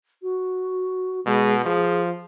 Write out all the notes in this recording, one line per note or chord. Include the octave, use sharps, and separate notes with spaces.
F#4
B2 G#3
F3 G#4